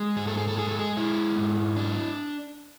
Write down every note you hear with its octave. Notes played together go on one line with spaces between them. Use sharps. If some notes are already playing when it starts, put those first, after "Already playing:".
Already playing: G#3
G#2 G#4
A4
G#4
A4
G#3 G#4
A4
G#4
G#3 E4
G#2
D4